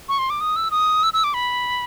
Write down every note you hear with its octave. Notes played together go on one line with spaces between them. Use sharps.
C#6
C6
D6
D#6
E6
D#6
E6
E6
D6
B5